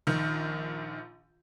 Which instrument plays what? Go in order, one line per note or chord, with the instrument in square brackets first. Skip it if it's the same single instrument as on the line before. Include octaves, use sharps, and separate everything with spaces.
[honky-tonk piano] A#1 D#3